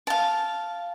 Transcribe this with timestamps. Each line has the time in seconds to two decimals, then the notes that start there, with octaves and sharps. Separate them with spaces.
0.07 F5 A5